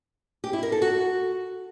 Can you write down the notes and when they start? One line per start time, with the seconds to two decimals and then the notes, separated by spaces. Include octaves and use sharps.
0.44 G4
0.53 E4
0.63 A#4
0.72 A4
0.82 F#4